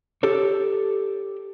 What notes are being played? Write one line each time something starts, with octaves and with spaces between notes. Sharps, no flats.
G4 A4 C#5